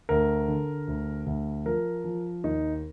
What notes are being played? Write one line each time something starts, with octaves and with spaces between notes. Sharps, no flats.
D2 A#4
D3
D2
D2
F3 A#4
F3
D#2 D#4